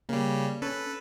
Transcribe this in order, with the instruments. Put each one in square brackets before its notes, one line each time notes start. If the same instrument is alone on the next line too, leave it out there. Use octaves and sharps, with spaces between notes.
[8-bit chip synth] C#3 G3 [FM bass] A#3
[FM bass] C#4 [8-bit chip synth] A4 B4